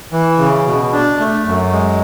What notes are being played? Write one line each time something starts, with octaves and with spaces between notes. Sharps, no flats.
E3
C#3
B2
D4
A3
F#2
G#3